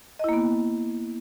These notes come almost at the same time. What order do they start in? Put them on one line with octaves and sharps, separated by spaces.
D#5 E4 A#3 B3